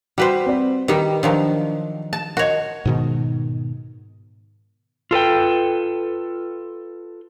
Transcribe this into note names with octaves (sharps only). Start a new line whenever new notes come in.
G3 F#4 B4 C5
C4 D5
D#3 G3 G4 B4
D#3 F3 F#3 D4
A5
F#4 A#4 C#5 D#5
G#2 B2 D#3
F4 A4 B4 G5